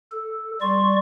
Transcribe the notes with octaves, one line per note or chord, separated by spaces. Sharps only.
A4
G3 D5 C6 C#6